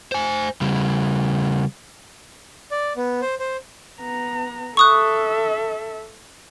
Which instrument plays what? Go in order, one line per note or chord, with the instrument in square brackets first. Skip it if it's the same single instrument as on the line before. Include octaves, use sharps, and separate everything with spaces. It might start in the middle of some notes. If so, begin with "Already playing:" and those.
[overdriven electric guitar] C5 G#5
C#3 G3
[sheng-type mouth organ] D5
B3
C5
C5
[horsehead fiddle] B3 A#5
[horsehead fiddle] A4 E5 [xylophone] C#6 D#6 F#6